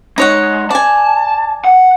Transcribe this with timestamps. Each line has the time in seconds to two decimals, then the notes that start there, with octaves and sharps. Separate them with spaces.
0.18 G#3 D#4 C#5 F#5
0.70 D5 G#5 A5
1.65 F#5